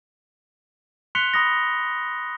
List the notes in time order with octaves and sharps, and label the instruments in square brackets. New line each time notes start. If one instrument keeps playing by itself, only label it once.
[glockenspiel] C6 F#6 B6 C#7 F7 G7
B5 D#6 A#6